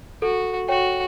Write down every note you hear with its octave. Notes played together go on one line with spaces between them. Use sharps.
F#4 A4
F#4 C#5 G5